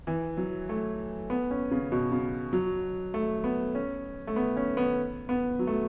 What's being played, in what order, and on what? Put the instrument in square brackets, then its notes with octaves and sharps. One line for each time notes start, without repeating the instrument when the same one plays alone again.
[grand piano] E3
F#3
A3
B3
C#4
C#3
B2
C#3
F#3
A3
B3
C#4
A3
B3
C#4
B3
B3
F#3
A3